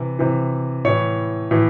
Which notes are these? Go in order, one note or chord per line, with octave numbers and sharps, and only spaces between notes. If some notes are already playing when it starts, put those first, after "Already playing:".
Already playing: C3 E3
C3 E3
A2 E3 C#5
A2 E3